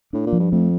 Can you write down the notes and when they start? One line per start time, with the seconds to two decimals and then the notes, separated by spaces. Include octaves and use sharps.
0.13 A2 D4
0.27 A#2
0.33 F3
0.39 G2
0.52 F2 A3